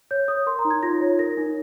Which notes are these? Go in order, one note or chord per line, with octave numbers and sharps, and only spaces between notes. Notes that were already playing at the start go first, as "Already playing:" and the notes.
C#5 G6
C#5 D#6
A#4 C6
A#5
D#4
G#6
F4 A#6
C#5
A#4 A#6
D#4